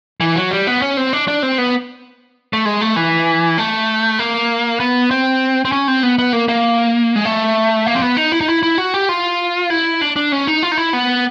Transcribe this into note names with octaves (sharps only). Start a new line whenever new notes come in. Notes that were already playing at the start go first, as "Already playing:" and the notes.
E3
F#3
G3
B3
C#4
C4
D4
D4
C4
B3
A3
G#3
A3
E3
A3
A#3
B3
C4
C4
C#4
C4
B3
B3
A#3
A#3
G#3
A3
A#3
C4
B3
D#4
E4
D#4
E4
E4
F#4
G4
F4
E4
D4
D4
C#4
D#4
F4
D#4
E4
B3